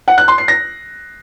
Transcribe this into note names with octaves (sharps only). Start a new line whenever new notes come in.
F#5
F#6
C6
C7
A#6